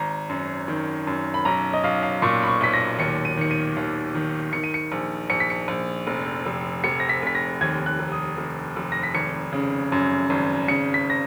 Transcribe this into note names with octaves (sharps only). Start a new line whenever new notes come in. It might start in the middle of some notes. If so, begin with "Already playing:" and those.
Already playing: G#1 A#5
F#2
D#3
F#2
B5
B1 A#5
D#5
B1 F5
F5
A#2 C#6
B5
C#6
B1 B6
A#6
D#2 C#7
D#7
D#3 C#7
D#7
D#2
D#3
D#3 C#7
D#7
C#7
A#1
A#1 C#7
B6
C#7
A#1
F1
F1
F1 C#7
A#6
B6
F1 B6
A#6
D#2 G#6
F#6
F1
D#6
F1
F1
A#6
B6
G#1 C#7
C#3
F#2
G#1
C#3 C#7
B6
A#6